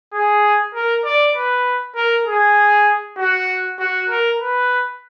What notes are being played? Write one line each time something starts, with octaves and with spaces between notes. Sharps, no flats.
G#4
A#4
D5
B4
A#4
G#4
F#4
F#4
A#4
B4